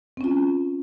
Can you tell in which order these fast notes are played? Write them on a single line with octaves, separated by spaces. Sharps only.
C4 C#4 F4